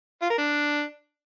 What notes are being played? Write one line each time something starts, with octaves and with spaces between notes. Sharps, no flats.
F4
A#4
D4